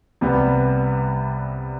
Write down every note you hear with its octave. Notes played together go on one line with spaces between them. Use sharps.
C2 C3 G3 B3